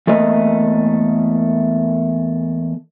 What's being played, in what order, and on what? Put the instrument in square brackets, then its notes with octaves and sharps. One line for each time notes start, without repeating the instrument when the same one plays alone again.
[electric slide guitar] E2 A3 A#3 D#5